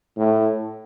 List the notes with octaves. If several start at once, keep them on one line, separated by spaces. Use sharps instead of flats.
A2